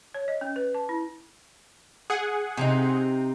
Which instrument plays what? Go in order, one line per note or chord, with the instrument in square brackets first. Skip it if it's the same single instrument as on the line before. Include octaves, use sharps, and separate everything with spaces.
[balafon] C#5
D#5
C#4
B4
A5
E4
[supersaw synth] G#4 F#5
[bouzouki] C3 C4 D#4